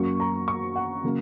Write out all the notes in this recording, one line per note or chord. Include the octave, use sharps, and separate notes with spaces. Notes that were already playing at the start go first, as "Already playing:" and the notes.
Already playing: F#2 F#3 A#3 C#6
A#5
C#6
F#5
C#3 F#3 A#3